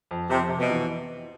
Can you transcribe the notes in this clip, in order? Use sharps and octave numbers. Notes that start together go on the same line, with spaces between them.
F2
F2 C3
C3
B2
E3